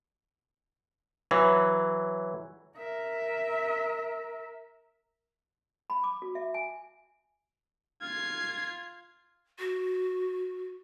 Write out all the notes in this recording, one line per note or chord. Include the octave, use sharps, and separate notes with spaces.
E3 F#3
A#4 E5
B5
D6
F#4
E5
G#5
F4 G#6 C7
F#4